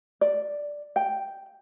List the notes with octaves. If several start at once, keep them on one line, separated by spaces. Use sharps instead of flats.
D5
G5